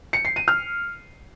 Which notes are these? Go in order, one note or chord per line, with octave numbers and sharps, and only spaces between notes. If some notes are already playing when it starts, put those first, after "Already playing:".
C#7
C7
D#7
F6